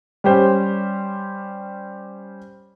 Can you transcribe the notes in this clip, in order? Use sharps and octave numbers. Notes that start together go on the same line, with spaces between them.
G3 C#4 G4 C5